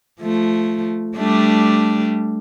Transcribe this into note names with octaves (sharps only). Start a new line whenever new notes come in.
F3 A3
G3 A3 D4